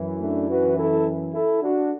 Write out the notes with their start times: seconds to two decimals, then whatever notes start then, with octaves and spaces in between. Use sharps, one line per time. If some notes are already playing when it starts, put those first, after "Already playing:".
Already playing: F#2 E3
0.20 A3 D4
0.49 F#4 B4
0.77 E4 A4
1.33 E4 A4
1.62 D4 F#4